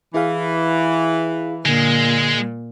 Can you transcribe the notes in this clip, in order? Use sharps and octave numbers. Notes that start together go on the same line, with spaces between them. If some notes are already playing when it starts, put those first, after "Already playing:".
E3 E4 G#4 F5
A#2 D3 G#3